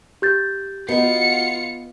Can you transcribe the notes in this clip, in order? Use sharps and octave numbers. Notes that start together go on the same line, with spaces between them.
G4 G6 A6
B3 D#4 F4 F#4 C#7